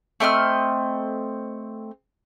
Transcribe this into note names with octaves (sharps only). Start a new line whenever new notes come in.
A3 C4 D#5 F6